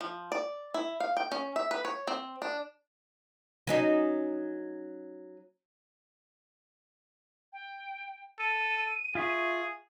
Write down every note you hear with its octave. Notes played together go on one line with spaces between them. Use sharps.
F3
D5
E4
F5
G5
C#4
E5
B4
C#5
C4
D4
F#3 C#4 D#4
G5
A4 D#7
F4 G#4 E5 C#6